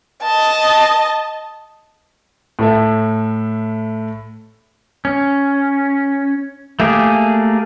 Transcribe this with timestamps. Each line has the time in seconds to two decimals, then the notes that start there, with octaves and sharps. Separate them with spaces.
0.22 D#5 A5
2.59 A2 A4 E5
5.05 C#4
6.80 A3 A#3 G4 G#4